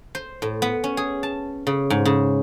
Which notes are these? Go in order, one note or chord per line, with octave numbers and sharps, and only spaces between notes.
C5
A2
B3
C#4
G#4
A5
C#3
G#2
C#3